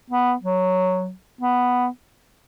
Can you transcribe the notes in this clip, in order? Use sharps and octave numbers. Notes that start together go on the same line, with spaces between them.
B3
F#3
B3